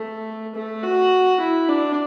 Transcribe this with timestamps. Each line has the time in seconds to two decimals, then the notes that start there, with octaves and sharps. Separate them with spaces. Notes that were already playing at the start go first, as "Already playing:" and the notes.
Already playing: A3
0.55 A3
0.83 F#4
1.40 E4
1.68 D4